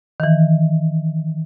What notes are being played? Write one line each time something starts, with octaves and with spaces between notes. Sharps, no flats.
D#3 E3